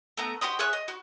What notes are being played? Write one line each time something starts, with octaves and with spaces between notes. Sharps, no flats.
A3 B3 A#5
F#4 G4 C5 D#5
G#4 C#5 E5 F#6
D#5
F#4